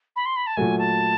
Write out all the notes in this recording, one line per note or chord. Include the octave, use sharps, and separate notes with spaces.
B5
C6
B5
A5
A#2 F#3 A3 G#5
A5